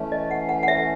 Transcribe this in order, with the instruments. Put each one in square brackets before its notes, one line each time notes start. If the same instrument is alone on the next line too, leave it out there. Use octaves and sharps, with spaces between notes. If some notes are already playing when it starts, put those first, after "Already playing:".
Already playing: [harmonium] E3 A3 C#4
[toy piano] D#5
F#5
F#5
F#5
E5